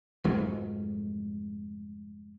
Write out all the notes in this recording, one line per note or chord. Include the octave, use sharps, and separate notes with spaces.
F1 F2 G#2 F#3